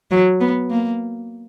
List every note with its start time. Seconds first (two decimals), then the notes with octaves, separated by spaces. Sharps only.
0.11 F#3
0.40 B3
0.70 A#3